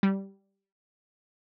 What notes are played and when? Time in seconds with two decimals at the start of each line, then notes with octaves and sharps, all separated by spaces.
0.03 G3